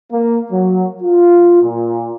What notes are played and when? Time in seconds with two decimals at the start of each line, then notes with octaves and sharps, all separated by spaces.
0.11 A#3
0.51 F#3
1.02 F4
1.62 A#2